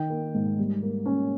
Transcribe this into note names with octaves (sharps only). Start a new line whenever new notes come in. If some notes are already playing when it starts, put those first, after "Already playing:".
Already playing: D#3 G5
A#3
G#2
G3
A#3
C#4